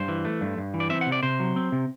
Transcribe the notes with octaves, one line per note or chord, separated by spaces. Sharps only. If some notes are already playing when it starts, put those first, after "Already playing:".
Already playing: G2 C5
E3
A3
G2
G2
E3
D5
C4 E5
F#5
C3
D5
C3 C5
F#3
C4
C3